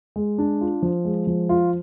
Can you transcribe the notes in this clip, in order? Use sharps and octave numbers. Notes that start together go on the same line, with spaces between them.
G#3
D4
F4
F3
G#3
F3
F4